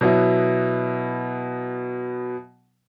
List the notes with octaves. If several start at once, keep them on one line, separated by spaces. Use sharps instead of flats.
B2 F#3 B3 E4